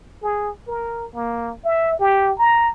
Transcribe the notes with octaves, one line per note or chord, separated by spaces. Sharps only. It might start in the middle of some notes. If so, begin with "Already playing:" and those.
G#4
A#4
A#3
E5
G4
A#5